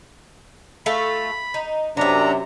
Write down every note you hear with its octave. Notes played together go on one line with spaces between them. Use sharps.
A3 F4 A4 B5
D#4
F#2 C3 B3 D4 E5 A#5